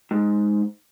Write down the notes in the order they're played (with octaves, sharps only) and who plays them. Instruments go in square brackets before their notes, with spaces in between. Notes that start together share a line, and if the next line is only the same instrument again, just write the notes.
[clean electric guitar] G#2